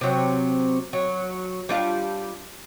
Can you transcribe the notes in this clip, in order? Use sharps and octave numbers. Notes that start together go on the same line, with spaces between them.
C3 F#3
F#3
G3 D4 F4